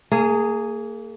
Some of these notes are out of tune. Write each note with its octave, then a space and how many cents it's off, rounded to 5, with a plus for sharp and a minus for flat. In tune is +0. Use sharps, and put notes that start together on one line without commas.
A#3 -35 G#4 +0